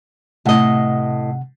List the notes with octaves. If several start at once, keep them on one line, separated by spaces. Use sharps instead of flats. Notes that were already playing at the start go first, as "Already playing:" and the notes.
A2 C3 D#5 F#5